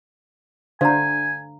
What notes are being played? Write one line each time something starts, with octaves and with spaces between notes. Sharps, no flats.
D3 D4 C5 F5 G#5 A#5